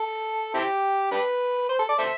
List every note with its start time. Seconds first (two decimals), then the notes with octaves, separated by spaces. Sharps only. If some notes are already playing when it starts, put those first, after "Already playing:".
Already playing: A4
0.54 C4 E4 G4
1.11 D4 G4 B4
1.69 C5
1.79 A4
1.89 D5
1.99 A4 C5 E5